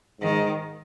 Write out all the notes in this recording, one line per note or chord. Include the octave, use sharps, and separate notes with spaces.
G#2 D#3